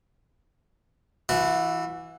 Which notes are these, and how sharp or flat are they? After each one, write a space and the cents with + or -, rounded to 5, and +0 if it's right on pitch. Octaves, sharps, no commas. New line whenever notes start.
E3 +0 F#4 -35